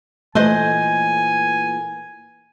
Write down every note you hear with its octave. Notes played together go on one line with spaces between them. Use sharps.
A#2 E3 A3 B4 C5 D#5 G#5